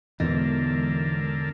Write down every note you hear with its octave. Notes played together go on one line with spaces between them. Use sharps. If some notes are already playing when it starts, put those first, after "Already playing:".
E1 G#2 D3 E3 B3 D#4 A4 A#4